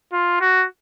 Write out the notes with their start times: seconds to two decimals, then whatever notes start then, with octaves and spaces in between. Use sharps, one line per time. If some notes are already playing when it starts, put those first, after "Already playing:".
0.13 F4
0.41 F#4